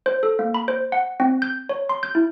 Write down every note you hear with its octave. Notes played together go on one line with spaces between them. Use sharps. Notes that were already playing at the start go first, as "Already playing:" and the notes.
C5
A4
A#3
B5
C5
F#5
C4
G6
C#5
C6
G6
E4